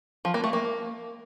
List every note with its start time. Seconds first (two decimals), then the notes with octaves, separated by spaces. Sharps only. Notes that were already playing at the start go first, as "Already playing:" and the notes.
0.25 F3
0.34 A#3
0.44 A3
0.53 A#3